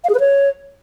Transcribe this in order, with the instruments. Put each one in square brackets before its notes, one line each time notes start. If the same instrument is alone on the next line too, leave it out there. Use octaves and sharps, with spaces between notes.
[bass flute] F5
G#4
B4
C#5